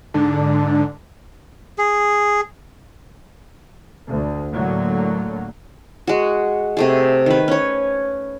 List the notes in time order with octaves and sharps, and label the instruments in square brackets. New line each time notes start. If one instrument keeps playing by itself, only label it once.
[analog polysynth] G#2 D3 D4
[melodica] G#4
[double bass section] D2
A2 D3 F#3 A#3
[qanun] G#3 F#4
C3 A3 G#4
D#3 B4
C#4 C#5